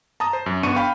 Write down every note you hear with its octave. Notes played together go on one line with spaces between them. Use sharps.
A5 A#5 D#6
C5
F#2
G1 B3 D4 C#6 C#7 D#7
F5 G5 B5